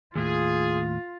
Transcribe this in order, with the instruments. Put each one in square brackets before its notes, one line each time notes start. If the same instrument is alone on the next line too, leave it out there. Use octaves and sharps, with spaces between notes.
[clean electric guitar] D#2 A2 [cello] F4 [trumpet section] G#4